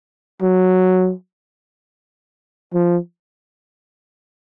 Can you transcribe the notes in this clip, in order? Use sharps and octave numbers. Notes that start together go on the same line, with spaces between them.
F#3
F3